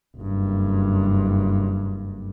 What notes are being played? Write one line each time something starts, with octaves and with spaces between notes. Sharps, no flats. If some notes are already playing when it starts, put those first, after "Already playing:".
F#1 G2